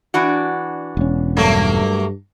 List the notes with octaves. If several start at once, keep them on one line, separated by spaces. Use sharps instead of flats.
E3 D4 F#4
E1 C#4
G2 F#3 A3 A#3